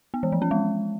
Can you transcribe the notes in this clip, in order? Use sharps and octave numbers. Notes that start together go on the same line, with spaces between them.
B3
E3
F3
C#4
G#3